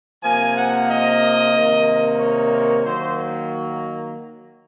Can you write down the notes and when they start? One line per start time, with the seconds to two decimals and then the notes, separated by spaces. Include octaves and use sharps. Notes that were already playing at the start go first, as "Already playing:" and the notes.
0.23 C3 F3 A#3 G#5
0.56 F#5
0.89 D#5
1.54 C3 D#3 A#3
2.19 C#5
2.85 D#3 F#3 A#3 C5